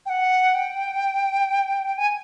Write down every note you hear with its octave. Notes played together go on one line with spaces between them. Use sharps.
G5
F#5
G5
G#5